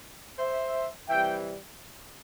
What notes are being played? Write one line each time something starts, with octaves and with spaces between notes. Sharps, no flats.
C5 E5
C3 E3 G3 E5 G5